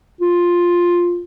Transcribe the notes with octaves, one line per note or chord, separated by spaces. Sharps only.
F4